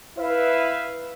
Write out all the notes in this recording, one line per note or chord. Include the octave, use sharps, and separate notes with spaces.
E4 B4 E5 F5